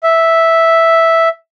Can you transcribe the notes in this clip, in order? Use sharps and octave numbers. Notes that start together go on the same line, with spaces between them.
E5